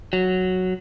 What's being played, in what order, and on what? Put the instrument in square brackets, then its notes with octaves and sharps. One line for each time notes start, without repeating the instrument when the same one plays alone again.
[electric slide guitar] F#3